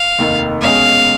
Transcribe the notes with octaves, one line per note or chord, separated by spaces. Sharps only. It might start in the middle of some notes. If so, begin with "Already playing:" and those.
Already playing: F5
F1 D#2 D#3
B1 B2 G#3 C#4 G#4 F5